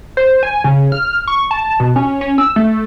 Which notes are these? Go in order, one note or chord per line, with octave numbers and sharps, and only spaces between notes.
C5
G#5
C#3
F6
C#6
A5
B2
C#4
C#4
E6
A3